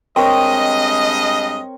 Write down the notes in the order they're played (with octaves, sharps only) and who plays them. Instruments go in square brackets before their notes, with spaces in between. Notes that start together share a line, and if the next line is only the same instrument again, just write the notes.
[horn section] G2 G#3 D#5 [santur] C4 A#4 C#5